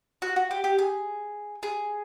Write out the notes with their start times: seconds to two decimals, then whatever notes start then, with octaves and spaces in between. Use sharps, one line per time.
0.22 F#4
0.36 F#4
0.51 G4
0.64 G4
0.79 G#4
1.63 G#4